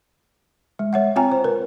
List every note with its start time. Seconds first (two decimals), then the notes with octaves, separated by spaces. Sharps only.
0.79 G#3
0.93 G#3 C#5 E5 F#5
1.16 C4 F4 C#5 G5 G#5 A#5
1.32 C5
1.44 A#4 B4